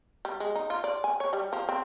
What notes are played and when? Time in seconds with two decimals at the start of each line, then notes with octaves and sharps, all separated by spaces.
0.25 G3
0.40 G#3
0.55 D#4
0.70 F4
0.84 D5
1.04 G#5
1.20 C#5
1.33 G3
1.53 F3
1.69 C4